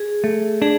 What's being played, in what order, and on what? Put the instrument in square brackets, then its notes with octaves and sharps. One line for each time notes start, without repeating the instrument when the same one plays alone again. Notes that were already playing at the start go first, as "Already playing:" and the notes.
Already playing: [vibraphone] G#4
[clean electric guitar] A3
[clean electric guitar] D4 [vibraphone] G#4